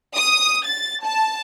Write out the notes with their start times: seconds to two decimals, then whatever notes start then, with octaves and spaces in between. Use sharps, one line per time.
0.16 D#6
0.67 A6
1.04 A5